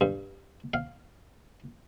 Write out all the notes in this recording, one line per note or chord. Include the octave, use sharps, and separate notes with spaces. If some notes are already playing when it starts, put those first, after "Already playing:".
G2
F5